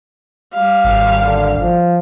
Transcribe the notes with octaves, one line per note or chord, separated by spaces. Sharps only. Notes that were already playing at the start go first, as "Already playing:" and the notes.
G3 F5
G#1
D3
F3